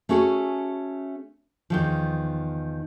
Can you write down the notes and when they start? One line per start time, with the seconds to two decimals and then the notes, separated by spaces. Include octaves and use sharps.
0.09 A3 C#4 F#4 G#4 A4
1.70 E2 D#3 F3